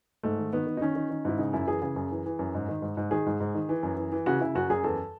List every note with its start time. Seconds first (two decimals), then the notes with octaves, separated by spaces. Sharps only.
0.23 G#2 A3
0.38 D#3
0.53 D#3 B3
0.67 D#3
0.77 D#4
0.81 D#3 C#4
0.96 D#3
1.10 D#3
1.25 G#2 E4
1.38 C#3 D#4
1.53 F#2 E4
1.67 E3 G#4
1.82 C#3 G#4
1.96 F#2
2.11 E3
2.26 E3
2.39 F#2
2.54 G#2
2.69 D#3
2.82 G#2
2.97 G#2
3.11 D#3 G#4
3.26 G#2
3.40 G#2
3.55 D#3
3.69 E3
3.83 F#2
3.97 E3
4.12 E3
4.26 C#3 F#4
4.40 C#3 E4
4.55 F#2 F#4
4.70 F#2 G#4
4.84 E2 A4